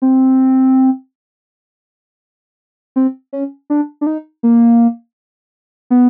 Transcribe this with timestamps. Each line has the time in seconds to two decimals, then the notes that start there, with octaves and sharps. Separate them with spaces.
0.02 C4
2.96 C4
3.33 C#4
3.70 D4
4.01 D4
4.07 D#4
4.43 A#3
5.90 B3